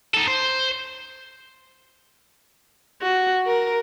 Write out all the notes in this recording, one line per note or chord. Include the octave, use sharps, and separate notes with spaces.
D#4 A4
C5
F#4
A#4